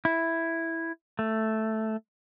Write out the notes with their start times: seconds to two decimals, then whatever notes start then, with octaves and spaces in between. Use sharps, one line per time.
0.05 E4
1.19 A3